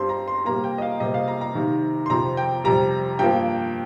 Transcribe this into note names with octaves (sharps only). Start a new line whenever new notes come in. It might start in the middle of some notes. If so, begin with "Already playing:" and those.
Already playing: G2 G3 C4 C6
A#5
C6
C3 G3 A#3 A#5
G5
D#5
F5
C3 G3 A#3 D#5
F5
A#5
A#5
C3 D#3 C4
C6
F2 C3 F3 C4 A#5
G5
F2 C3 G3 A#5
G2 F3 A#3 G5